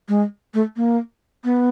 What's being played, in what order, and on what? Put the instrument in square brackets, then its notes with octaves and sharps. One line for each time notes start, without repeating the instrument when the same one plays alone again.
[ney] G#3
A3
A#3
B3